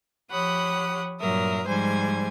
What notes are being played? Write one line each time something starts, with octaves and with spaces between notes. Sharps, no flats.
F3 G4 C#5 F#5 B5 D#6
G2 A#2 F#3 A#4 E5 D#6
G#2 F3 G3 C5 G#5 G#6